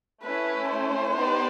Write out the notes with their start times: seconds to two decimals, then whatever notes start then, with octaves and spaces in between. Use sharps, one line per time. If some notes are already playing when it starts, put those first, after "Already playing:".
0.24 A3 C#4 E4 B4
0.70 C5
1.17 B3 D#4 G4 B4 D5